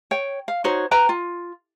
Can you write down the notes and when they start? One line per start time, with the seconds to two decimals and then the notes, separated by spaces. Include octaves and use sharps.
0.11 C#5 G5
0.48 F5
0.64 D#4 F#4 C5 C#5
0.91 B4 G5 A#5
1.09 F4